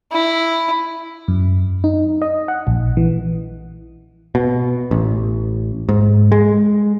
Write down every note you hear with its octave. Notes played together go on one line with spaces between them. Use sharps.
E4
F#2
D#4
D#5
F#5
A#1
E3
B2
A1
G#2
G#3